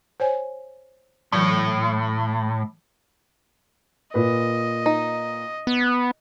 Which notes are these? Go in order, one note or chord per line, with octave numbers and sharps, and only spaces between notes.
C5 C#5 G#5
A2 E3 F#3
A#2 B4 D#5
D#4
B3